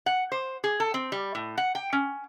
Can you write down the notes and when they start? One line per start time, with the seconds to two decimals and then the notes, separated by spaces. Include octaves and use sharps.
0.06 F#5
0.32 C5
0.64 G#4
0.80 A4
0.94 C4
1.12 G3
1.35 A2
1.58 F#5
1.75 G5
1.93 C#4